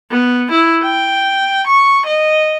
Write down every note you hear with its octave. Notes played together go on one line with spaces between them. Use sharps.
B3
E4
G5
C#6
D#5